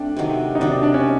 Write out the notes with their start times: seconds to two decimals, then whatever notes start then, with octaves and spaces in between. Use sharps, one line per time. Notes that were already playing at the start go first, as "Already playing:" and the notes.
Already playing: A3 C4 D4
0.17 C3 D#3 F#3
0.55 D#4
0.60 C3 D#3 F#3 D4
0.71 D4
0.83 D4
0.94 C#4